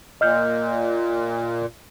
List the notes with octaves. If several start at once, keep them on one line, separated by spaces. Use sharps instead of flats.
A#2 D#5 F6 G6